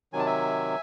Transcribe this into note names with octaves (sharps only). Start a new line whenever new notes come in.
C3 D#3 F#3 G#5
A5
E5 G#5